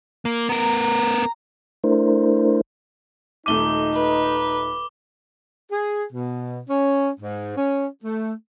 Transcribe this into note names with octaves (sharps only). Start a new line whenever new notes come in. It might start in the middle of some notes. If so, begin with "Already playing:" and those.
A#3
B3 A#4 A#5
A3 D4 E4 A#4 C5
D#1 A3 D#4 D6 D#7 G7
B4
G#4
B2
C#4
G#2
C#4
A3